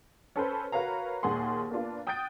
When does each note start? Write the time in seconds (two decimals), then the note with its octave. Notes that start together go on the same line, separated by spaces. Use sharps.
0.36 C#4 A4 B4 C5
0.72 F#4 A#4 B4 C#5 F5 A#5
1.23 D#2 A#2 G#4 F#5 C6
1.70 A#3 B3 D4 F4
2.07 G5 D#6 F#6 G6 A6 D7